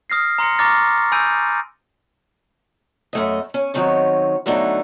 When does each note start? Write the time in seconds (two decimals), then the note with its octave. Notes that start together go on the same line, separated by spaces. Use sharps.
0.10 D#6 F6 A#6 C7
0.38 A#5 C6 A#6 C#7
0.59 A#5 C#6 D6 F6 A6 A#6
1.12 G#5 B5 E6 G6 D7 D#7
3.13 F#2 A3 D#5
3.54 C#4
3.74 D#3 F#3 C4 D#4 C#5
4.46 D3 F#3 A3 B3 D4 D#4